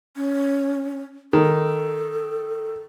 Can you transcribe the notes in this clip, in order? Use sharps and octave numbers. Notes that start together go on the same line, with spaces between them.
C#4
D#3 A4